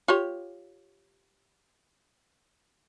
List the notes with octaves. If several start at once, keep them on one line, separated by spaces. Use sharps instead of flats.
F4 G4 C#5